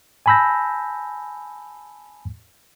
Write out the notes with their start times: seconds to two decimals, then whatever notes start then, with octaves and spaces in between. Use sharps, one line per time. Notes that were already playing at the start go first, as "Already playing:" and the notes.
0.26 G#5 A5 B5 E6 G6 A#6